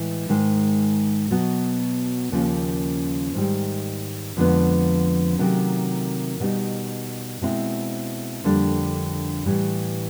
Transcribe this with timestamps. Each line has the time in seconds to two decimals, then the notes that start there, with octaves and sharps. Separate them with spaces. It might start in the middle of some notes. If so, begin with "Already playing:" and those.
Already playing: A2 E3 G#3
0.29 G#2 D#3 G#3
1.31 B2 F#3 B3
2.32 D#2 C#3 F3 A#3 C#4
3.35 G#2 D#3 G3
4.37 F2 D3 F3 G#3 B3
5.38 C3 D#3 F#3 A3 C#4
6.40 B2 G3 B3 D#4
7.41 B2 G#3 C4 E4
8.44 F2 D3 G3 A#3 D4
9.46 A2 E3 G3